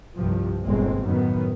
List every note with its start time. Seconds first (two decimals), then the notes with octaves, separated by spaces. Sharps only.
0.16 C2 G2 C3 F3
0.64 G1 A#2 G#3 C4
1.04 F#2 A2 D#3 B3